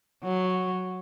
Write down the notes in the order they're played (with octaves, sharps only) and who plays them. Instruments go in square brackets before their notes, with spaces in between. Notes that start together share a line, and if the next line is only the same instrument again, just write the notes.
[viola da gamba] F#3